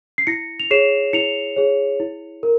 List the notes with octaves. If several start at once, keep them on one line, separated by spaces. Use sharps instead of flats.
C7
E4 A#6 C#7
F7
G#4 C#5 C7 E7
E4 C#7 F7
G#4 C#5
E4
A#4